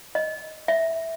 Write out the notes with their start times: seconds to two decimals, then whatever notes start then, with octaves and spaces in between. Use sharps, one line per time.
0.15 D#5
0.68 E5